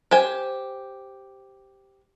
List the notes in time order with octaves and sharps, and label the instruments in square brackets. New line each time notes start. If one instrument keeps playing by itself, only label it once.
[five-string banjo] G4 C5 G#5